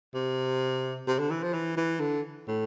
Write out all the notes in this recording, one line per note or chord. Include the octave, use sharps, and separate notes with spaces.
C3
C3
D3
E3
F3
E3
E3
D3
A2